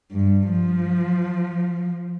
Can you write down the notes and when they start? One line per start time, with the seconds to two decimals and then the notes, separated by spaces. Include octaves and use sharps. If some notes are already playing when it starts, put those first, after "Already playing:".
0.12 G2
0.50 F3